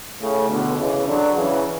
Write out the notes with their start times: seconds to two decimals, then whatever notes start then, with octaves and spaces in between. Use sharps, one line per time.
0.21 A2 C#3
0.49 B2 D3
0.78 C#3 E3
1.07 D3 F#3
1.35 C#3 E3